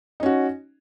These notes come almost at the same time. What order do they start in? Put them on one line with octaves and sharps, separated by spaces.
D#4 C#4 F#4